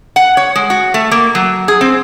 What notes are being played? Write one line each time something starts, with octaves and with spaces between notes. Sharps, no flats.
F#5
C#5
G#3
F#4
A3
A#3
F#3
G#4
C4